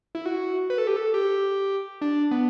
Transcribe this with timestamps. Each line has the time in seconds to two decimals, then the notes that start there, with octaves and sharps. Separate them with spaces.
0.15 E4
0.26 F#4
0.70 B4
0.78 A4
0.87 G4
0.97 A4
1.14 G4
2.01 D4
2.31 B3